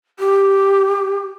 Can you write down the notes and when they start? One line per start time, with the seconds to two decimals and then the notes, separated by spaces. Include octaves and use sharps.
0.19 G4